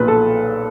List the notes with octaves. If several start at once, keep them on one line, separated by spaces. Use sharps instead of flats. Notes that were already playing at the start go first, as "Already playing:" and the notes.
Already playing: B1 A#2 F3 B4
A4